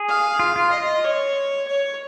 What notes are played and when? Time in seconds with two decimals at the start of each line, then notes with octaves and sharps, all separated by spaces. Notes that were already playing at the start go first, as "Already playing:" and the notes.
Already playing: G#4
0.08 F5
0.39 F4
0.56 F4
0.72 D#5
1.04 C#5
1.68 C#5